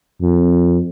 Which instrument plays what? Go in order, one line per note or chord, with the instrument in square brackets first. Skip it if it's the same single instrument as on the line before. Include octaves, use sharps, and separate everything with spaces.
[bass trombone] F2